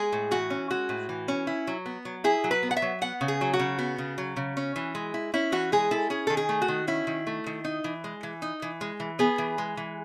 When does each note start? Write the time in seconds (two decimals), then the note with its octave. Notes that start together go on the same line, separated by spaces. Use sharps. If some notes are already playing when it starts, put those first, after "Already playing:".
Already playing: G#3 G#4
0.12 A2
0.31 E3 F#4
0.50 C#4
0.70 G#3 F#4
0.89 A2
1.09 E3
1.28 C#4
1.47 E4
1.67 F#3
1.86 B3
2.05 F#3
2.24 E4 G#4
2.44 F#3
2.51 B4
2.63 B3
2.71 F#5
2.77 E5
2.82 F#3
3.01 B3 F#5
3.21 C#3
3.28 G#4
3.41 F#3
3.53 F#4
3.59 C#3
3.78 B3
3.98 C#3
4.18 F#3
4.36 C#3
4.57 C#4
4.76 E3
4.95 G#3
5.14 E4
5.34 C#4 E4
5.52 E3 F#4
5.72 G#3 G#4
5.91 E4 A4
6.10 C#4 G#4
6.27 D#3 A4
6.37 G#4
6.49 A3
6.62 F#4
6.68 D#3
6.87 C#4 E4
7.07 D#3
7.27 A3
7.46 D#3
7.65 D#4
7.84 E3
8.04 G#3
8.23 E3
8.42 D#4
8.62 E3
8.81 G#3
9.00 E3
9.19 B3 G#4
9.38 E3
9.58 G#3
9.77 E3